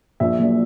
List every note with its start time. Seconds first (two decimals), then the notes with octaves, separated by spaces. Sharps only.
0.20 A#1 E5
0.39 A#2 F#3